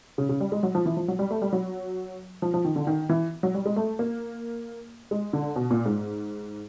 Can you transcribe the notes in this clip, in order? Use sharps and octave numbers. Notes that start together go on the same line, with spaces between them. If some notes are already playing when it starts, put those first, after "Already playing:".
C#3
C#3
G3
G#3
F#3
F3
E3
F3
F#3
G3
A3
G3
F#3
F3
F3
D#3
D3
D#3
E3
F#3
G3
G#3
A3
A#3
G#3
D3
B2
A#2
G#2